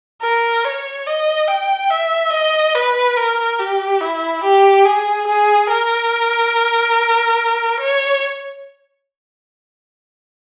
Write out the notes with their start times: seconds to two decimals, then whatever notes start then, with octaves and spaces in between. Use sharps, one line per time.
0.22 A#4
0.64 C#5
1.07 D#5
1.48 G5
1.90 E5
2.32 D#5
2.75 B4
3.17 A#4
3.59 G4
4.01 E4
4.43 G4
4.85 G#4
5.27 G#4
5.69 A#4
7.80 C#5